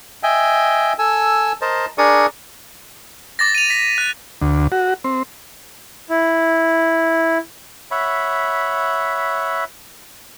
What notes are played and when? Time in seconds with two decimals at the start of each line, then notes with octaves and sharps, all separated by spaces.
0.23 D#5 E5 G5 G#5
0.99 A4 G#5 E6
1.62 A#4 C5 D#5 A5
1.98 D4 G#4 A#4 D5 C#6 D#6
3.39 D6 A6 A#6
3.55 D#7 F7
3.70 B6
3.98 F#6
4.41 D2
4.72 F#4
5.04 C4
6.10 E4
7.91 C#5 E5 F#5 B5